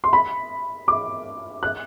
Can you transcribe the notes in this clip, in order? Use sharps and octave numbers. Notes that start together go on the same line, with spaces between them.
C6
B5
D6
F#6